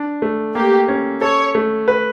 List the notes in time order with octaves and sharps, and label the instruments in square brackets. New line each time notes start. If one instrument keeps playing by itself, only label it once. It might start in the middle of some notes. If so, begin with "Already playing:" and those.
Already playing: [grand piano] D4
A3
[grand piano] A#3 [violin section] G4
[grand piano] C#4
[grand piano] A4 [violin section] C#5
[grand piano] A3
B4